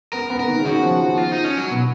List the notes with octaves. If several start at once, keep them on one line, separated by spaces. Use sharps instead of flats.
B3 A#4
B3
A#4
D#3
C#3
D#3 F#4
F3
F3
F4
D#4
C#4
F#3
B2